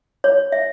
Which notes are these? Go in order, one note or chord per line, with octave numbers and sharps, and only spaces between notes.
C#5
E5